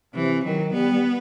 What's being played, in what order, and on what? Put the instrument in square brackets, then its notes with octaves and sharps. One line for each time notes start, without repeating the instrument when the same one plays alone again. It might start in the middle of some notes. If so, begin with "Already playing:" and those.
[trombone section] C3 [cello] E3
[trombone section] D#3 [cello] F#3
[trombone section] G3 [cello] B3